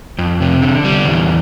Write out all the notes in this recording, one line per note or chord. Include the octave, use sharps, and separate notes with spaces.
F2
C3
D3
G3
E2